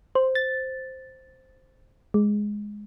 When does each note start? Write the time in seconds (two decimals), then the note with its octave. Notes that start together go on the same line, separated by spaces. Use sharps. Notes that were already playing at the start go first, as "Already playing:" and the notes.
0.15 C5
0.35 A6
2.14 G#3